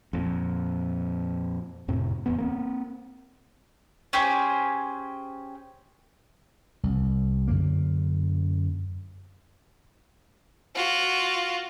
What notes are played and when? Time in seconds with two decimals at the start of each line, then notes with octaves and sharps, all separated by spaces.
0.13 F2 A#2
1.88 F2 A2 C3
2.26 D1 E2 B3
2.38 A#3 C4
4.13 C#4 G4 G#4 C5
6.83 C2
7.48 F#2 D3 A#3
10.75 F4 F#4